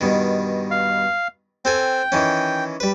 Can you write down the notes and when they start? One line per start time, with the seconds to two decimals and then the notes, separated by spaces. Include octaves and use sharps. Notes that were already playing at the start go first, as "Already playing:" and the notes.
0.01 G2 B2 D#3
0.71 F5
1.65 C4 A4 G5 G#5
2.12 D#3 E3 C#4
2.80 G3 B4